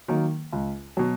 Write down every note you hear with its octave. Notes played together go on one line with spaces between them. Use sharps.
D#3 F#3 A#3
C#2
B2 F#3